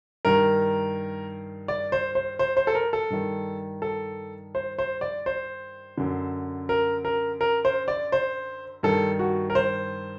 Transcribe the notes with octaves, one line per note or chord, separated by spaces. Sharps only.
G2 D#3 A#4
D5
C5
C5
C5
C5
A4
A#4
A4
G2 D#3
A4
C5
C5
D5
C5
F#2 D3
A#4
A#4
A#4
C5
D5
C5
G2 D#3 A4
F#4
A#4
C5